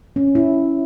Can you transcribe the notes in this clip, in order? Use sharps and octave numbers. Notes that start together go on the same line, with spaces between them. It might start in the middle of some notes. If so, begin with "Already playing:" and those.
C#4
E4